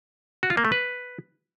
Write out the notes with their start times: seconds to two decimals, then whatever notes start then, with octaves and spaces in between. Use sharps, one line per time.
0.43 F#4
0.50 F4
0.57 A#3
0.65 A3
0.72 B4